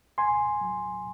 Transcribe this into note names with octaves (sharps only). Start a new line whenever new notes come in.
D#2 G#5 C6
F#3